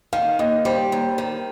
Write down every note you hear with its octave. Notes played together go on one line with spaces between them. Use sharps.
D#3 F5
D#2 D#5
G3 C5
D#2
D#3